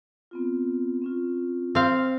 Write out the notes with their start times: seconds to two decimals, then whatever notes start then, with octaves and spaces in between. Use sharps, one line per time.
0.31 B3 C4 F4
1.02 C4 C#4 F4
1.75 C4 F5